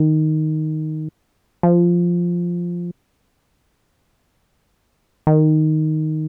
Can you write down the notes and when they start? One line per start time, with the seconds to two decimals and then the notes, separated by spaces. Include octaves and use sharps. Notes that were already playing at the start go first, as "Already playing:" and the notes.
Already playing: D#3
1.63 F3
5.27 D#3